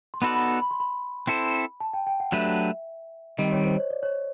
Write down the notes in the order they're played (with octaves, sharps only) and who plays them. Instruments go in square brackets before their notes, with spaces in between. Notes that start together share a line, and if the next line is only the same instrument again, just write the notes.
[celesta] C6
[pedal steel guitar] B3 D#4 F#4 A4 D5 [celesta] B5
[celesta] B5
B5
B5
C6
B5
[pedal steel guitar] C4 E4 A4 C5
[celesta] A5
G5
G5
F#5
[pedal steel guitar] F#3 A3 D4 G4 B4 [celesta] E5
[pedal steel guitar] D#3 G3 C4 [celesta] D#5
[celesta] C#5
C5
C#5
D5
C#5